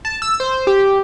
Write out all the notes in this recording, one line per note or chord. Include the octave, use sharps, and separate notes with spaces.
A5
E6
C5
G4